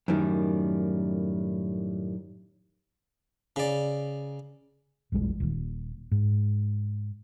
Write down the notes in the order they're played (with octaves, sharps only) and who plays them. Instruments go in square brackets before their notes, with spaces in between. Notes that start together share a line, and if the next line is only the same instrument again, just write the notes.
[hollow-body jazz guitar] F#2 A2 D#3 G3
[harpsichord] C#3 D5
[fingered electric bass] E1 A#1 G3 G#3
D#1 D#2
G#2